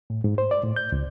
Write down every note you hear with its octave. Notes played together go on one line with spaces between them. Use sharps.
A2
G#2
C5
D5
A2
G6
C#2